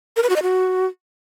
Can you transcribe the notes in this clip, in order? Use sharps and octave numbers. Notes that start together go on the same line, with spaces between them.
A#4
B4
F#4
D#5
F#4